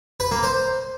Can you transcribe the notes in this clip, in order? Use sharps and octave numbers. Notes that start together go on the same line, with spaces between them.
B4
A#3
C5